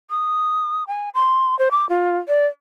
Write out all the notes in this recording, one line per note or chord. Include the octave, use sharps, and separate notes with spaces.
D#6
G#5
C6
C5
D6
F4
D5